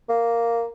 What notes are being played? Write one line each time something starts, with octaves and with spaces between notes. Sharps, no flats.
A#3